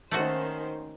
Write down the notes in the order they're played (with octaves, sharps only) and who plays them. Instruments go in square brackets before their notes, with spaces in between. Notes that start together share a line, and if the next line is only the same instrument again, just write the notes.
[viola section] D#3 C#4 C5 [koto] A3 A#3 F#4